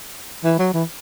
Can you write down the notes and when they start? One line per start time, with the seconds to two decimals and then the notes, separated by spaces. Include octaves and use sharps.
0.44 E3
0.59 F#3
0.74 E3